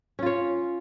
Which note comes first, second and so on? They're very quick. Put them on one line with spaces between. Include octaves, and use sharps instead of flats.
C#4 F4 C#5